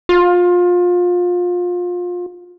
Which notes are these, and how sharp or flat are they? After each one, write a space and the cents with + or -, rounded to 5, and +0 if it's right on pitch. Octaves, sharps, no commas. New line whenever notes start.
F4 +25